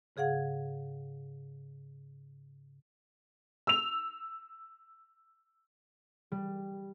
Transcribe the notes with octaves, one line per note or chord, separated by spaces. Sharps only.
G#2 C#3 G#4 F5 F#5 G#6
E6 F7
G3